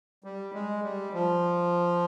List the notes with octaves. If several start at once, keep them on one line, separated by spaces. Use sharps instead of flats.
G3
G#3
G3
F3